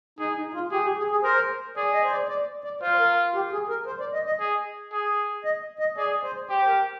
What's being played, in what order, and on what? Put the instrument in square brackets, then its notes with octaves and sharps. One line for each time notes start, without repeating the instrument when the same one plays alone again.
[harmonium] D#4 [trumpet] G#4
[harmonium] D#4
F4
[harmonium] G4 [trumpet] G#4
[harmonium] G4
G#4
G#4
[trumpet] A#4 [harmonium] C5
[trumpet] G#4 [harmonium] D5
[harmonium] D#5
C5
D5
D5
D5
[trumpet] F4 [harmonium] C5
[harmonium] A#4
G4
G#4
A#4
C5
D5
D#5
D#5
[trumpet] G#4
G#4
[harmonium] D#5
D#5
[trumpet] G#4 [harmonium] D5
[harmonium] C5
[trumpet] G4 [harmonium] C5
[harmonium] A#4